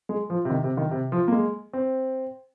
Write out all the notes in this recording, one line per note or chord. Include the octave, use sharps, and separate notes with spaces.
G#3
F3
C3
D#3
C3
D#3
C3
F3
A#3
G#3
C4